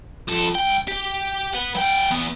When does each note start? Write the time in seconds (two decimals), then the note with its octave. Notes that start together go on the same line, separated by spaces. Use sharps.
0.28 F3 A4
0.55 C2 G5
0.88 G4
1.53 B4 F#5
1.75 F#3 G5
2.11 E3 B3